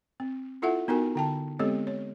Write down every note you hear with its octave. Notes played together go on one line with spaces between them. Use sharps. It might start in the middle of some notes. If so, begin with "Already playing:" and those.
C4
E4 F4 A4 E5 F#5
B3 D#4 F#4 A#4 G#5
D3 G5 A5
G#3 B3 C4 G4 A4 C#5
C#5